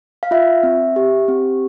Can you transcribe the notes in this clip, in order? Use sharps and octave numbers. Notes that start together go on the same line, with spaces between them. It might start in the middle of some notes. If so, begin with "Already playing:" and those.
F5
F4 E5
C4
G4
C4